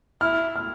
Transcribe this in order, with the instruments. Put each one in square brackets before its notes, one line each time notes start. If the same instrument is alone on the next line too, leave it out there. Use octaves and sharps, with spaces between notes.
[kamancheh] E4 [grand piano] F6
[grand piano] F6